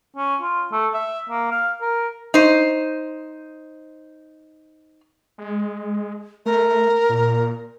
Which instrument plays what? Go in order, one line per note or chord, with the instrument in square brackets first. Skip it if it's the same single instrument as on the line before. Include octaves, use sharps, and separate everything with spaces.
[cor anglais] C#4
F4
A3
E5
A#3
F5
A#4
[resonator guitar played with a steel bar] D#4 C5
[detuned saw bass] G#3
[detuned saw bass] A3 [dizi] A#4
[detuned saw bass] A#2